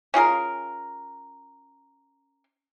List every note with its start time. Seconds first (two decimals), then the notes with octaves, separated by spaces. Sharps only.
0.14 C#4 F4 G#4 A#4